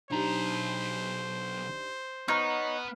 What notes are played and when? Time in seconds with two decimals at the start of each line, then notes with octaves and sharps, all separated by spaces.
0.11 B1 D4 D#4 G4 C5 A#5
2.28 B3 D#4 C#5 A#5 F6 F#6